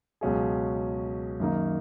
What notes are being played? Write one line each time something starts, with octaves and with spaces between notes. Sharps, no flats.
C#2 B2 F#3 C#4 G#4
F#2 D#3 A#3 D#4